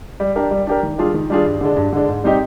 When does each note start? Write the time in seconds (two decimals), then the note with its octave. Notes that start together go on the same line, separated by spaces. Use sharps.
0.20 G3
0.36 D4 G4 A#4
0.51 G3
0.67 D4 G4 A#4
0.83 D#3
0.98 G3 D4 F4 G#4
1.14 D#3
1.30 G3 D4 F4 G#4
1.45 G2
1.61 D3 G#3 D4
1.77 G2
1.93 D3 G#3 D4
2.08 G#2
2.24 G3 C4 D#4 G4